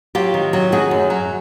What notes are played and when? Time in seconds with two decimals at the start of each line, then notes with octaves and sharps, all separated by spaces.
0.15 F#3 F4 G4
0.34 D#3
0.53 F#3
0.72 D#3 F#4 G#4
0.91 F#2
1.10 F#3